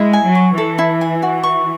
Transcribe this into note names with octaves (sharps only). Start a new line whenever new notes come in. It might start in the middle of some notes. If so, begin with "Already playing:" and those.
Already playing: G#3 E4
G#5
F#3
C#5
E3 A4
E4
G#5
F#4
C#6